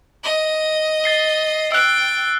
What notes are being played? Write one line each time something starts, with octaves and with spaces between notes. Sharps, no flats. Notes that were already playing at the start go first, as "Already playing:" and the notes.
D#5
A6 C7 G7
G5 E6 F#6